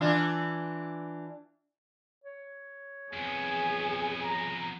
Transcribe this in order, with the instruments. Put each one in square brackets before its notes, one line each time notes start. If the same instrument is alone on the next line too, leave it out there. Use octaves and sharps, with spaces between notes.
[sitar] E3 D4 F4
[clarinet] C#5
[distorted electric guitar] F2 B3 [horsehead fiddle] G#4 G#5
[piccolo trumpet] A#5